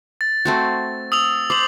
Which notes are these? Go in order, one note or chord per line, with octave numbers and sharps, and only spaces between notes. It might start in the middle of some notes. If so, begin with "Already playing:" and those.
A6
A3 C4 F#4
D#6 E6 F7
C5 D6 F#7